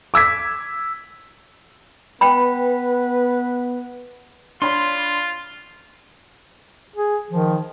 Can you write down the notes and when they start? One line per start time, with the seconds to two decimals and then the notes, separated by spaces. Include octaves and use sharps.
0.14 D6 E6 G#6 B6
2.21 B3 B4 G5 B5
4.62 D4 F4 C#5 B5 C6
6.96 G#4
7.30 D#3 F3